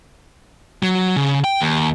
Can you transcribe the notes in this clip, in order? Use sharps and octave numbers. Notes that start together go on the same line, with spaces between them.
F#3
C#3
G5
D#2